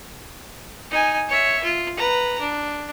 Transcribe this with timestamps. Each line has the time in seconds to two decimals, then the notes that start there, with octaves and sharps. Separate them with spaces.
0.91 D#4 G#5
1.29 C#5 E5
1.64 F4
1.97 B4 A#5
2.40 D4